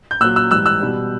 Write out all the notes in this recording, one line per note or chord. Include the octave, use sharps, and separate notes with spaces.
G6
A#2 F#3 E6 F#6
E6 F#6
G#2 E3 G3 E6 F#6
E6 F#6
B2 G3